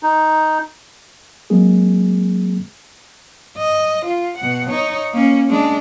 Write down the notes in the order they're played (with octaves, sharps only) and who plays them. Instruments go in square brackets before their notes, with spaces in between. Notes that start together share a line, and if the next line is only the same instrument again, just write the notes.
[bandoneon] D#4
[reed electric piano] F#3 G#3 A#3 C4 G#4
[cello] D#5
F4
B2 F#5
D#4 C#5
A#3 C#4
G#3 D4